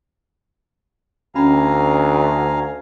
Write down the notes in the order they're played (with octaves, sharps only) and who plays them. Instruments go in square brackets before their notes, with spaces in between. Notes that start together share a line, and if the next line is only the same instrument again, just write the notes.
[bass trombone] D2 [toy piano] C#4 B5 [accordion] F5 G#5 A#5